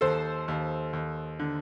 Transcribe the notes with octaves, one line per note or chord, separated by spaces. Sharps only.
D#2 A4 C5
D#2
D#2
D3